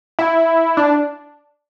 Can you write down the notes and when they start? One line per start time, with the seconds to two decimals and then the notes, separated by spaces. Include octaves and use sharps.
0.19 E4
0.77 D4